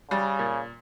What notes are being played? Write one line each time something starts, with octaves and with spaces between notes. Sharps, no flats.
C#3 G3
A#2